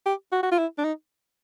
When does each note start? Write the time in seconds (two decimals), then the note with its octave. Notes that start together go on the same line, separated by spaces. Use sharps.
0.06 G4
0.33 F#4
0.43 F#4
0.52 F4
0.58 E4
0.78 D4
0.84 D#4